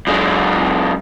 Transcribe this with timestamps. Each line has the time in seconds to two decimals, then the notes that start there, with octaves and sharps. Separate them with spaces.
0.07 F#2 G#3